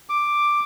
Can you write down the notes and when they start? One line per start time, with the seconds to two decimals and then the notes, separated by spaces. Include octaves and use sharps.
0.09 D6